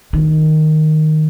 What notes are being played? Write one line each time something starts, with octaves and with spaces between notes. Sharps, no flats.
D#3